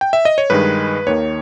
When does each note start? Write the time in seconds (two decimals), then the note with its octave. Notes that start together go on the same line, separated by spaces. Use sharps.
0.01 G5
0.13 E5
0.25 D#5
0.38 C#5
0.50 G2 D#3 G#3 B4
1.06 D#2 D#3 A#3 C#5